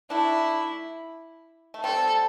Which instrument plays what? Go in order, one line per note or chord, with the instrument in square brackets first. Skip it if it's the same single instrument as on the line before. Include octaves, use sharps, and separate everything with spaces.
[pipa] A3 D4 [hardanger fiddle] E4
[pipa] A3
[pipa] G3 C4 [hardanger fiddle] A4